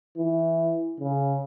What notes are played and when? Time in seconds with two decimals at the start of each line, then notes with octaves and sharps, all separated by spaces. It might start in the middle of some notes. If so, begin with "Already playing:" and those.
0.17 E3
1.01 C#3